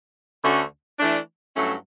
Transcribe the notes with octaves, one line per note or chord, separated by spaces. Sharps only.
D2 D3 A3 C#4 F#4
E3 A3 D4
G2 F#3 A3 C#4 E4